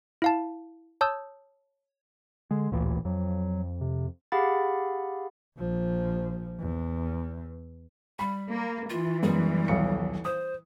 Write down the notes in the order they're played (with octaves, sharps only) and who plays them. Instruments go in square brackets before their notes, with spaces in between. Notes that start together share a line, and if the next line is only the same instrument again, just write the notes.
[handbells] E4 F5 A5
C#5 A5 D#6 E6 G6
[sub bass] D3 [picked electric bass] G#3
[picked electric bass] A1 A#2 E3 [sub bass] D2
[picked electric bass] F2 [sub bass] F#3
[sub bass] C3
[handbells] G4 G#4 F5 F#5 B5 A6
[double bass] A#1 F3
E2
[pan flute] G3 [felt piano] B5
[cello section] A#3
[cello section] E3 [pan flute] F4
[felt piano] F#2 G#3 B3 [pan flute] G3
[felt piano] D#1 B1 C#7
[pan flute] C5 [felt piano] D#6